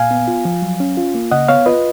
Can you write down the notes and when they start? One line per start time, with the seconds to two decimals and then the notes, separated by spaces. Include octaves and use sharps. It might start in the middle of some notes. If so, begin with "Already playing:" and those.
Already playing: A#2 F5 G#5
0.11 B3
0.28 F4
0.45 F3
0.62 F#3
0.80 C#4
0.97 F4
1.14 A#3
1.31 C#3 D#5 F#5
1.48 B3 C#5 F5
1.66 F4 B4 D#5